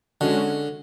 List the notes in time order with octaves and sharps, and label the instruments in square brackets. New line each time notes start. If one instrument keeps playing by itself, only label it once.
[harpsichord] D3 [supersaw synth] G#3 C#4 F#4